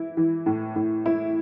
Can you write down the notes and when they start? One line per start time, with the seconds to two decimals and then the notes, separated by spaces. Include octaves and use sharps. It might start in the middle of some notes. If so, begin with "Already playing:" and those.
Already playing: E3 E4
0.17 E3
0.46 A2
0.76 A2
1.06 E4